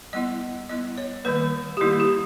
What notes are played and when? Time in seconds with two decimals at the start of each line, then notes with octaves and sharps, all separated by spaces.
0.13 G3 B3 E4 D#5
0.69 G3 B3 E4 D#5
0.98 C#5
1.25 D#3 G3 A#3 B4
1.77 G4
1.81 D#3 G3 A#3 E4
2.00 G4